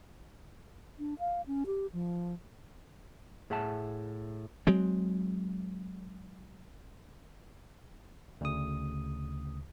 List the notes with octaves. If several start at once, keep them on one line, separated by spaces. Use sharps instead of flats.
D4
F5
C#4
G4
F3
A2 G#4 E5 F#5 A5
F#3 G#3 C4
D2 C#3 D#6